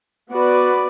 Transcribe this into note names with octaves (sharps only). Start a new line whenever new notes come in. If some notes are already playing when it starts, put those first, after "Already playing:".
B3 F#4 B4 D5